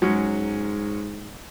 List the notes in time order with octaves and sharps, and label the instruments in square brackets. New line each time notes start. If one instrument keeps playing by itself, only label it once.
[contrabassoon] G#2 [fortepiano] F#3 G#3 C#4